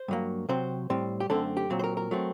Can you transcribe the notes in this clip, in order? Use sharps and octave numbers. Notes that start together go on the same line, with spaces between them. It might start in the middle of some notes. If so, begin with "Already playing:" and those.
Already playing: C5
G2 F#3 A#3
C3 F#3 C4 C5
A2 G3 C4
G4
F#2 D3 A3 C4 A4
G4
A#2 F#3 C4
C5
A#4
A#4
F#3 A3 C4